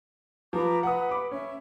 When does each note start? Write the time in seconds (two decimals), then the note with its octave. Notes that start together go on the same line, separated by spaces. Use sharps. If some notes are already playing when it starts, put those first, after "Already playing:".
0.53 F3 B4 A#5 D6
0.83 B4 F#5 D#6
1.09 B5 D6
1.31 C#4 E5